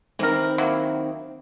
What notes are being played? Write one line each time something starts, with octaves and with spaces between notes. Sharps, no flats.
D#3 E3 C4 A#4
F#3 A#3 E4